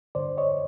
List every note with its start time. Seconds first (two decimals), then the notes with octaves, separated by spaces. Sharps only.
0.15 G2 D3 C5 D5
0.37 C#5 D#5